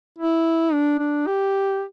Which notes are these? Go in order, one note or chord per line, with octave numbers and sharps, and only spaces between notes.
E4
D4
D4
G4